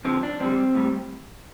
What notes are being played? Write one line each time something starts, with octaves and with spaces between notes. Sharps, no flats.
F2 D3 F3 C4
D4
F2 D3 G3 C4
A2 G3